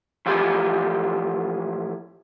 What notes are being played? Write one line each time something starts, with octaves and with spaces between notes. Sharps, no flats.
A2 E3 F3 G4 G#4